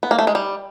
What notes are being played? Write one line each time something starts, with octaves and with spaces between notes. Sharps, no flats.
B3
A#3
A3
G#3
G3